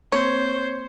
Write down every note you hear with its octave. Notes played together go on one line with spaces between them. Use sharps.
A#3 C4 C5 C#5